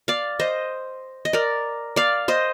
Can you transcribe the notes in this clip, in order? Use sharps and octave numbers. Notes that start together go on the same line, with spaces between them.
D5 F5
C5 D#5
D#5
A#4 D5
D5 F5
C5 D#5